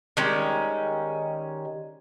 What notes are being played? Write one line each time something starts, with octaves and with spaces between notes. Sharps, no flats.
D#3 G3 G#3 C#4